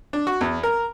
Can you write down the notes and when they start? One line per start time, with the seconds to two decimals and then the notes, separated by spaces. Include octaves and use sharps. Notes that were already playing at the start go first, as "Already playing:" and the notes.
0.13 D4
0.27 F#4
0.41 E2
0.63 A#4